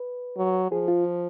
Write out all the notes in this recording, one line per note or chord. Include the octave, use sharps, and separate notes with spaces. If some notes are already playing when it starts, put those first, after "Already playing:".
Already playing: B4
F#3
F3 G#4
F4